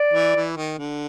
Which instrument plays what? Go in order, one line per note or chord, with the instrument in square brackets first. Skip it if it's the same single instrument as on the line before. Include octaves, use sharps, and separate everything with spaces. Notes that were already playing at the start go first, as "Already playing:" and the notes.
Already playing: [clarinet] D5
[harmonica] E3
E3
D#3
D3